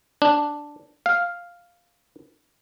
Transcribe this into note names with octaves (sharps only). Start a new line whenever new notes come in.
D4
F5